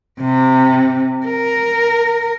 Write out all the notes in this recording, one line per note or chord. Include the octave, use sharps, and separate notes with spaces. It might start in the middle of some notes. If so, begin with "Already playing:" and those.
C3
A#4